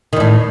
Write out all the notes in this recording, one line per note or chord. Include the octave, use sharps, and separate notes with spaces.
E2 A2 D#3